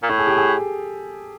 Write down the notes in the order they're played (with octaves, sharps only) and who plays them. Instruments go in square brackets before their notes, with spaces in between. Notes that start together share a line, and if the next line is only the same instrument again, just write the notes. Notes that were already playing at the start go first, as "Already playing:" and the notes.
[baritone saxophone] A#2
[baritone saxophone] A2 [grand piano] A4
[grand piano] G#4
G4
G#4